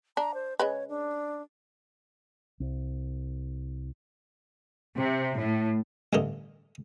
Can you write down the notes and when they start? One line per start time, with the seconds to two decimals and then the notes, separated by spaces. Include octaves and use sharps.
0.17 D4 A#5
0.34 C5
0.59 C#3 G#3 B4 C#5
0.89 D4
2.60 C2
4.97 C3
5.36 A2
6.13 A1 G2 D3 A#4 D#5